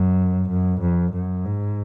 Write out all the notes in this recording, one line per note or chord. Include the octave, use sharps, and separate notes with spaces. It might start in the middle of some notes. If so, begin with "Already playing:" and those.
Already playing: F#2
F#2
F2
F#2
G#2